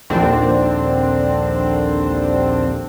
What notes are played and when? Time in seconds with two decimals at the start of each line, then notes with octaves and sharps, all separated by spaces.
0.10 A#1 D#2 D3 C4 D4